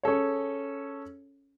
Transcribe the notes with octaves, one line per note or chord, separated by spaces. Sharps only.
C#4 G#4 A4 C#5